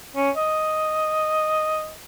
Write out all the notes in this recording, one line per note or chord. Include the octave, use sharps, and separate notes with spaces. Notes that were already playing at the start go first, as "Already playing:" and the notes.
C#4
D#5